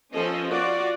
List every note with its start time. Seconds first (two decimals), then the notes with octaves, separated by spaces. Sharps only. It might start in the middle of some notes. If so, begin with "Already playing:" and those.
0.13 F3 C#4 A4 D#5
0.48 F4 F#4 D5